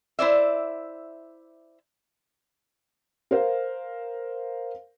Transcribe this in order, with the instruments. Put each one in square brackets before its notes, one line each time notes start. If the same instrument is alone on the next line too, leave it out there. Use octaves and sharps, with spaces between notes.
[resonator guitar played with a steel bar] E4 C5 D5 E5
[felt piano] A#4 C5 F5